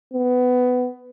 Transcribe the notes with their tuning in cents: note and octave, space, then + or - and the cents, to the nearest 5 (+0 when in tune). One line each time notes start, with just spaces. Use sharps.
B3 +15